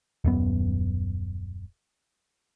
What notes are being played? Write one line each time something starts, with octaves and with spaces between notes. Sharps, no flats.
D#1 F#2 B3